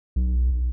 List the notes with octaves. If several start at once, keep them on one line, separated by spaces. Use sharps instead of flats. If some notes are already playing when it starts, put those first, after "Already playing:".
B1